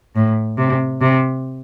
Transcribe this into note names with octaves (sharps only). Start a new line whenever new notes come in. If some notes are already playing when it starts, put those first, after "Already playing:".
A2
C3
C3